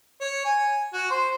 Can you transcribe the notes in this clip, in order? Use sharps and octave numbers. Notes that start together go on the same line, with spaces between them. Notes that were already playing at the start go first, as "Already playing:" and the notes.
C#5
G#5
F#4
C5